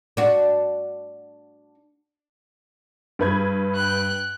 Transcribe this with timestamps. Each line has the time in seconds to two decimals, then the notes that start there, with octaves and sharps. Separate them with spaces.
0.17 D4 F#4
3.19 G2 B4 G#6
3.76 G5 F#6